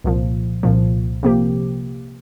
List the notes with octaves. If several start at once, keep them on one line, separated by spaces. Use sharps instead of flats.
C2 A#2 F3
C2 A#2 F3
C3 F3 A#3 G4